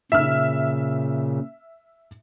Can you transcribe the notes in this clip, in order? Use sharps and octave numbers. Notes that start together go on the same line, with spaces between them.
A#2 C#3 E5 F6